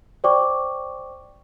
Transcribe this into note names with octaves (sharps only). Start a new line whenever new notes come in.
C5 D5 G5 C#6 D6